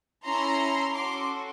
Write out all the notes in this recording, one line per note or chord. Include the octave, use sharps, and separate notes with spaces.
C#4 E4 A4 A#5 C6
C#4 F#4 A4 C6 D6